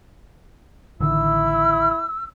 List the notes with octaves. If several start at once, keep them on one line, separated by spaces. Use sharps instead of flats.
A1 D3 D#3 E4 E6